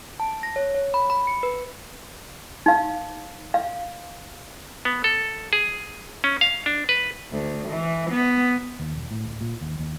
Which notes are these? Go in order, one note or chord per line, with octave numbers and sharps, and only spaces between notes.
A5
A#6
C#5
C#5
B5
B5
C#7
B4
D#4 F5
F5
B3
A4
G#4
C#4
F5
D4
B4
D2
E3
B3
D#2
E1
A2
D1
A#2
D#2
D#2